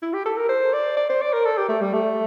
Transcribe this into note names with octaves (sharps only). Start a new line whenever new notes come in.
E4
G4
A4
A#4
C5
D5
D5
C5
D5
A#4
A4
G4
A3
G3
A3